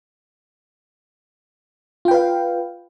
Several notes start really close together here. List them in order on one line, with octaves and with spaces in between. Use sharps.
F4 G5 B4 F5